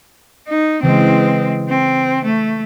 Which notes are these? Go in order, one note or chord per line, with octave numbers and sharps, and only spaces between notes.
D#4
C#3 E3 G#3 C4
C4
A3